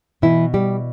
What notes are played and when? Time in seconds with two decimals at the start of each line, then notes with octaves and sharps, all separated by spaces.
0.22 B2 E3 E4
0.54 G3 G4